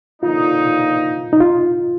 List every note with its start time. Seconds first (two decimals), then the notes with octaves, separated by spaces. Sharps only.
0.22 D3 F3 A#3 D#4 F4
1.33 D#4
1.40 F4